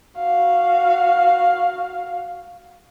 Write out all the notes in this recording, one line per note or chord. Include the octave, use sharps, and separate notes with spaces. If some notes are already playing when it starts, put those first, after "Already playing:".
F#4 F5